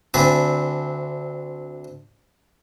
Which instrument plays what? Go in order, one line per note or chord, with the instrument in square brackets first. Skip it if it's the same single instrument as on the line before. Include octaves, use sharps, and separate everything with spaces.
[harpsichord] D2 C4 D4 B4 G#5 D6